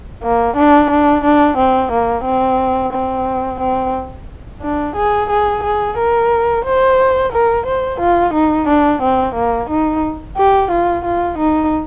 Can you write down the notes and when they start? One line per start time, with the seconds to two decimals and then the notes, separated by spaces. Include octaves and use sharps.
0.23 A#3
0.57 D4
0.90 D4
1.24 D4
1.57 C4
1.92 A#3
2.25 C4
2.93 C4
3.60 C4
4.62 D4
4.96 G#4
5.30 G#4
5.63 G#4
5.97 A#4
6.65 C5
7.32 A#4
7.66 C5
8.00 F4
8.33 D#4
8.68 D4
9.02 C4
9.35 A#3
9.69 D#4
10.37 G4
10.71 F4
11.04 F4
11.38 D#4